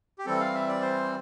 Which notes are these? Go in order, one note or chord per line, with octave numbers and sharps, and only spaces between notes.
G4
E3 G3 C4 A4
F5
E5
D5
C5